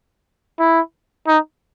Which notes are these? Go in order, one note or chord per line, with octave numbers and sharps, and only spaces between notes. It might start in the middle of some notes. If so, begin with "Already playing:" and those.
E4
D#4